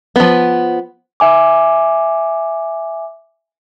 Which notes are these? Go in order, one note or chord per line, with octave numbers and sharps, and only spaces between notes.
F3 B3
E5 G#5 D6